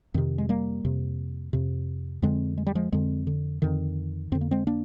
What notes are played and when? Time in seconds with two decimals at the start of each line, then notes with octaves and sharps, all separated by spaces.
0.14 F2 C3 D#3
0.38 G#3
0.49 G3 A#3
0.85 F2 C3
1.53 F2 C3
2.22 F2 D3 G#3 C4
2.58 G#3
2.67 G3
2.75 F3 G#3
2.92 F2 D3 G#3 C4
3.27 D3
3.62 F2 D3 D#3
4.32 F2 D3 C4
4.41 A#3
4.51 G#3 C4
4.67 A#3 D4